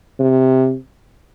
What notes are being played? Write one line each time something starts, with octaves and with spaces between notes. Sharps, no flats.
C3